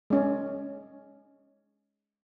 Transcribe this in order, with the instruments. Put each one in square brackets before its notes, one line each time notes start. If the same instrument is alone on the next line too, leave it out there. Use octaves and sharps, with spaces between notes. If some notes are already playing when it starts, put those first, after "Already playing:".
[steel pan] G#3 C#4